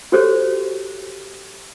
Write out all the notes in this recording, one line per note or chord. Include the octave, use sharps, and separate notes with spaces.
F#4 G4 A4 C5 C#5